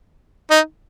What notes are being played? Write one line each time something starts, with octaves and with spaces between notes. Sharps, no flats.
D#4